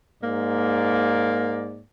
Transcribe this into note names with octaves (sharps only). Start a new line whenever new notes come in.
G#2 A#3 D5